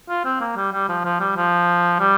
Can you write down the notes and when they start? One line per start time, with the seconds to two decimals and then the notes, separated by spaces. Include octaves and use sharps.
0.09 F4
0.25 C4
0.41 A#3
0.56 G3
0.73 G3
0.89 F3
1.05 F3
1.20 G3
1.36 F3
2.00 G3